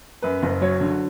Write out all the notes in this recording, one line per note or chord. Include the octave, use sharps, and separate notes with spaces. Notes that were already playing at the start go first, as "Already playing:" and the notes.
F#2 B4
F#1
F#3 C#5
D3